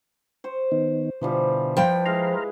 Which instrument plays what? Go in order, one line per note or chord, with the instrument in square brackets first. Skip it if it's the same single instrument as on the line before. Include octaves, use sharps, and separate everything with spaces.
[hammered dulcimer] C5 C#6
[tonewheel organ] D#3 B3 D#4
[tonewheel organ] B2 D3 [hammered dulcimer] E3 F3 G3
[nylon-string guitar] F3 G5 [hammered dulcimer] B4
[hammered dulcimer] G#3 E4 F5 [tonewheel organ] A#5 C6 F6